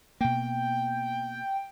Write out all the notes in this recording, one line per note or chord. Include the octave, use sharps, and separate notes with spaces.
B2 A#3 G5